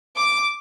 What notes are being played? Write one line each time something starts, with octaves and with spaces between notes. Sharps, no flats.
D6